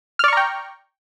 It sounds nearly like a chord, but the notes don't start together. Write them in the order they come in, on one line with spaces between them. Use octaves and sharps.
F6 D5 C#6 A#5 G5